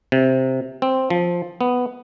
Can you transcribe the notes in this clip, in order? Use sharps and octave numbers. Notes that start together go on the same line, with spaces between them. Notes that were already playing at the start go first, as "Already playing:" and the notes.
C3
C4
F3
B3